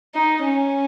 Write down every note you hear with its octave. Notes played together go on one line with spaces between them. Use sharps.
D#4
C#4